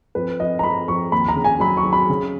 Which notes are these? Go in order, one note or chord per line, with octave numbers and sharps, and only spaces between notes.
F2 B4
F2 D#5
A#5
F2 B5
F2 C#6
D#2 B5
A#5
C#3
G#5
F#3 B5
C#6
F#3
B5
C#3